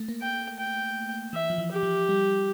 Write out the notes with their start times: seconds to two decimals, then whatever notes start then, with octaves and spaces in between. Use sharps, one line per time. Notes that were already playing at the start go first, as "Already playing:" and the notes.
Already playing: A3
0.08 A#3
0.22 G5
0.59 G5
1.33 E3 E5
1.50 F3
1.58 E3
1.71 G4
1.83 F3
2.09 G3